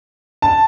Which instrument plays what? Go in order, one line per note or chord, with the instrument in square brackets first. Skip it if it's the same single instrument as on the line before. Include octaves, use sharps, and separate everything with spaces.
[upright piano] A5